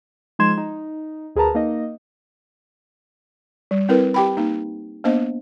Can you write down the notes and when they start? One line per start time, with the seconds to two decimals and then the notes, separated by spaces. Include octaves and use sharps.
0.39 F3 G#3 D#4 C6 G#6 E7
0.58 D#4
1.36 D2 G#4 A#4 B4 A5 A#5
1.55 A#3 D#4 D#5
3.71 G3
3.89 C4 E4 A#4 B4
4.14 G4 G5 B5
4.37 A#3 D#4
5.04 A#3 B3 D4 C5 D#5